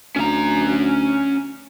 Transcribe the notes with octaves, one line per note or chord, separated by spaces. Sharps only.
D2 C#4 A#5